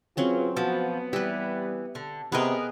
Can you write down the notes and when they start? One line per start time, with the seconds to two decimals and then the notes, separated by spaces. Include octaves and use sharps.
0.17 F#3 C4 C#4 F4 G#4 B4
0.57 F3 B3 F#4
1.13 E3 G3 G4 B4
1.95 D3
2.32 C3 B3 G#4 A#4 B4 D#5